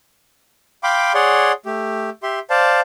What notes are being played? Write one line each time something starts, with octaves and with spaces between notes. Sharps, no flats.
F5 G5 B5 C6 D6
G#4 C#5 D5 F#5 C6
A3 G4
G4 E5 C6
C5 D5 F5 A5